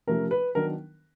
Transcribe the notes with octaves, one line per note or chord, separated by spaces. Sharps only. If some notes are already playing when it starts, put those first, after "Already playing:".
C3 F3 A3 C#4 A#4
B4
D#3 F#3 B3 D4 A#4